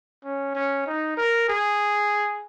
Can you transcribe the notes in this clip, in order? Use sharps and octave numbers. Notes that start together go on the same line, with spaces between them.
C#4
C#4
D#4
A#4
G#4